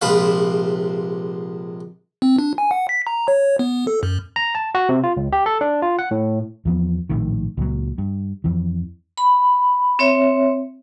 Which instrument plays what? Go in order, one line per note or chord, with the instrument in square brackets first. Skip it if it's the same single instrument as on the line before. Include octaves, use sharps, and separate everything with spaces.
[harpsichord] A#1 C3 G#3 B4 F5
[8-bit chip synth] C4
D4
G#5
F#5
B6
A#5
C#5
B3
A4
F#2
[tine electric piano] A#5
A5
F#4
C3
F4
C#2
G4
A4
D4
F4
F#5
A2
[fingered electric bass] E2 F3 B3
A#1 A2 D#3
C#2 A#2 F#3
G2
F2 E3
[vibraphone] B5
C4 C#5 E5